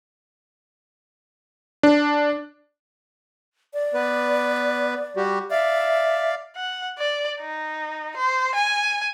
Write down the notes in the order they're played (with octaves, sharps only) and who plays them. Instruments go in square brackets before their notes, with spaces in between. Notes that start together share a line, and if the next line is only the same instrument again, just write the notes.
[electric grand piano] D4
[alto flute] D5
[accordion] B3 B4
G3 F#4 G4
[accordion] D5 F5 [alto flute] E5
[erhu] F#5
D5
D#4
C5
G#5